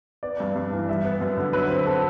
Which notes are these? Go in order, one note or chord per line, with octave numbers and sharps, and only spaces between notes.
B3 D5
G2
G2
E3
G3 E5
B3
F#2
D3
F#3 B4
C4
A4